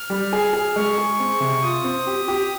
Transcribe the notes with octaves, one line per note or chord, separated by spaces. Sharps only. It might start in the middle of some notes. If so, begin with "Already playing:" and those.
Already playing: F6
G3
G#4
G#4
G#3 C#6
G#4
C4
C3
F4 D#6
C4
G4
G4